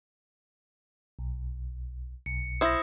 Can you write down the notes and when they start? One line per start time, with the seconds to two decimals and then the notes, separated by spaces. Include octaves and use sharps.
1.19 B1
2.26 B1 C#7
2.61 E4 C5 D#6 A#6